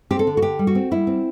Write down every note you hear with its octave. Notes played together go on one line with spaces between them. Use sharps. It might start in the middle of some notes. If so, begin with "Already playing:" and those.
C4 G4
A4
D3
F#4
D3 G4
G3
F#4
C4
G3 E4
C4